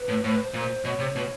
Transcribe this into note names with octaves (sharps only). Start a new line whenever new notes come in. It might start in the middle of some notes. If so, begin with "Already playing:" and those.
Already playing: B4
A2
A2 C5
B4
C5
A#2
B2 C#5
C3
B2